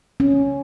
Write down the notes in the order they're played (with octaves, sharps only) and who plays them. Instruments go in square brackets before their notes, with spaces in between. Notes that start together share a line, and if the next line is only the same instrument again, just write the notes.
[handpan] C#4